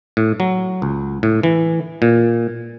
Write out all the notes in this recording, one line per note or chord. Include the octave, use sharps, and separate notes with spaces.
A2
F#3
C#2
A2
E3
A#2